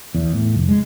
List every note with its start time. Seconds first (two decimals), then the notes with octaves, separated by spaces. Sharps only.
0.15 E2
0.34 A2
0.54 F1
0.69 G#3